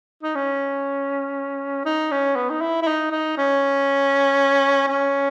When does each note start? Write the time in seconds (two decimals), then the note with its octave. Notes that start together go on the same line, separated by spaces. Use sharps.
0.23 D#4
0.35 C#4
1.85 D#4
2.12 C#4
2.36 B3
2.50 D#4
2.61 E4
2.82 E4
2.87 D#4
3.11 D#4
3.37 C#4
4.88 C#4